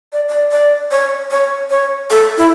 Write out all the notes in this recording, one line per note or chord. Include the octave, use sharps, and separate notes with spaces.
D5
D5
D5
C#5
C#5
C#5
A4
E4